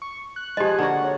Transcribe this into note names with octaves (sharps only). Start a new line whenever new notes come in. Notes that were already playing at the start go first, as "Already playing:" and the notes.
C#6
F#6
F3 G#3 G4 G#4 D#5
D3 A#3 F#4 F#5
C#5